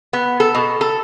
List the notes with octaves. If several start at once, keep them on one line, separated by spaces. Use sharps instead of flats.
B3
A4
B2
A4